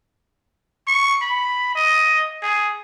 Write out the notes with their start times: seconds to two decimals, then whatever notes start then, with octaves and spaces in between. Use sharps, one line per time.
0.87 C#6
1.22 B5
1.75 D#5
2.42 G#4